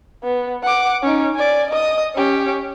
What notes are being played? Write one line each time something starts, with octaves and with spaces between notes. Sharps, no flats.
B3
F#5 D6
C#4 D#4
D5 G#5
D#5 D#6
C#4 G4